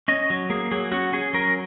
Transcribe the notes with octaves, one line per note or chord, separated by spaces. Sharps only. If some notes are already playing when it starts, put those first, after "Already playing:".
C#4 D#5
F#3
A#3 G#4
F#3 G#4
C#4 F#4
C#4 G#4
F#3 A#4